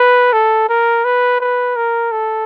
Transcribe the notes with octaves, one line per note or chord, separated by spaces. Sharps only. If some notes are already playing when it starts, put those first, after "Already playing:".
Already playing: B4
A4
A#4
B4
B4
A#4
A4